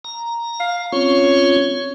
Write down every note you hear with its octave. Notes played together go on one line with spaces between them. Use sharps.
A#5
F5
C4 C#4 F4 C#5